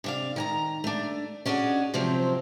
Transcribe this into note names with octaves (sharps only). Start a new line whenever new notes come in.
C3 D4 F5
D#3 G#5 A#5
A3 D4
C#4 D4 F#4 G#4 D#5
C3 F3 F#3 C4